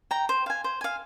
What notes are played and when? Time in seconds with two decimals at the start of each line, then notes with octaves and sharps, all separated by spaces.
0.11 G5 A#5
0.29 C5
0.46 F5 G#5
0.64 C5
0.81 F5 G#5